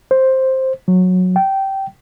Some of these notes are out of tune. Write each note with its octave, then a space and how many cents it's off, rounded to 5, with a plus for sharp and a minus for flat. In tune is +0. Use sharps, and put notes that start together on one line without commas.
C5 +5
F#3 -15
G5 -15